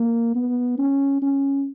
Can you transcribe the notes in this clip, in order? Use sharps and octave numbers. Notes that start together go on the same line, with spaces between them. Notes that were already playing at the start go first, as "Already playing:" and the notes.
Already playing: A#3
B3
C#4
C#4